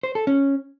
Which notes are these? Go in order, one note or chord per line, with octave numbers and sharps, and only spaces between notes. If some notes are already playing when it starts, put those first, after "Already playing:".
C5
A4
C#4